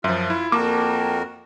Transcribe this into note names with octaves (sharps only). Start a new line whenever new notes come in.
F#2 F3 F4 E5
E4
F2 A#3 F#4 A#4 G5 A5 D6